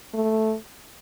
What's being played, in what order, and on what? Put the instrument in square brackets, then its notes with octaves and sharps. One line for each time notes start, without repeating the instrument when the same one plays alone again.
[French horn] A3